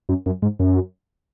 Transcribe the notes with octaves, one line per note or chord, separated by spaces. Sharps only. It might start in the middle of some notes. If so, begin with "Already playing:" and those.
F#2
F#2
G#2
F#2